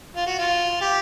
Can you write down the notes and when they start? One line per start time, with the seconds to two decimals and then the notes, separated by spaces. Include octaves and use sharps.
0.16 F4
0.27 F#4
0.39 F4
0.81 G4